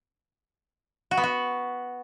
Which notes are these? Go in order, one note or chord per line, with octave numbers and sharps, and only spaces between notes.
F#4
B3
F#4